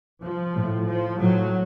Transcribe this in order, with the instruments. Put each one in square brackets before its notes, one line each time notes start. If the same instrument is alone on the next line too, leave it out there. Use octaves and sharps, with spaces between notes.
[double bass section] F3
A2
F3
A2 F#3